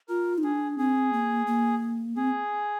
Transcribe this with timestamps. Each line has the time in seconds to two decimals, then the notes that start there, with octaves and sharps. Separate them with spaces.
0.09 F4 A#4
0.38 D#4
0.43 D4 G#4
0.78 C4 G#4
1.13 A#3
1.47 A#3
2.16 C4 G#4